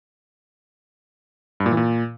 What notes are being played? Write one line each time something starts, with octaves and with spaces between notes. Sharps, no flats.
G2
A#2
E3
A#2